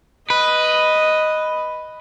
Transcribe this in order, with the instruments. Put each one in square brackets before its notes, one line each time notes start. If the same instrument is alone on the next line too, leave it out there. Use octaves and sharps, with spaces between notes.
[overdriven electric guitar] B4 [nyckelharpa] D#5